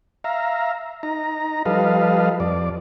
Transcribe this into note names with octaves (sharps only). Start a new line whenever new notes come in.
E5 F5 A#5
D#4 A#5
F3 G3 A4 B4 D#5 F5
F2 D5